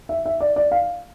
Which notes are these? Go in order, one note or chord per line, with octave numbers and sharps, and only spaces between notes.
E5
E5
D5
D5
F5